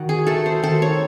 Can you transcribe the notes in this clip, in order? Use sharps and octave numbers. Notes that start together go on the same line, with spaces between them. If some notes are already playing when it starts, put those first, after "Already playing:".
Already playing: D#3 F#4
G#4
A3 A4
C5
D#3 A4
C#5